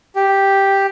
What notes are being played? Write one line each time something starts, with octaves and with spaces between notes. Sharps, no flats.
G4